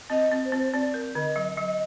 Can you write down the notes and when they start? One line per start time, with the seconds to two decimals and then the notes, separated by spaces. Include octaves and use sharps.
0.10 C4 D#5
0.32 C4
0.45 C5
0.52 C4
0.59 C5
0.73 C4 D5
0.94 A#4
1.15 D3 D#5
1.36 F#3
1.57 F#3 D#5